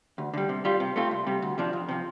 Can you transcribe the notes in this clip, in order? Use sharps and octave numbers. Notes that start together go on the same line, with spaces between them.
D2
D3 G3
C3
G3 F4
C3
A3 C4 F4
C2
C3 G3
D2
C3 F3 D4
F2
C3 F3